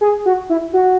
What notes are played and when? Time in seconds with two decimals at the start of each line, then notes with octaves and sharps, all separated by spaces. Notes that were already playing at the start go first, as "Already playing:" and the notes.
0.01 G#4
0.26 F#4
0.50 E4
0.73 F#4